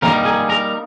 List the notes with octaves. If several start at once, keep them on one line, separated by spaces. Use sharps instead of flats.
C#3 E3 G3 A#3 D#4 A#4 A#5
G#4 G#5
A#4 A#5